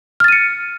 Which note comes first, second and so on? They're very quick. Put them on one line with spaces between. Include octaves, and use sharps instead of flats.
F6 A6 D#7 C#7